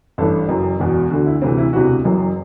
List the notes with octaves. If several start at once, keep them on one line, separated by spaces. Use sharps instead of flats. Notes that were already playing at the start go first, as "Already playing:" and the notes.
A1 G2 E3 A4
F#1 F#2 E3
E1 E2 B2
D2 D3 F#4
E4
D2 C3 E3 C4
E4
E1 D2 C3 E3 F#4
F#1 F#2 E3